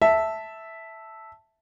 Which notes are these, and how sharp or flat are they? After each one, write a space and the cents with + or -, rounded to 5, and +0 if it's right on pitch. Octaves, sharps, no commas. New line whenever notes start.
E5 -5 A5 +0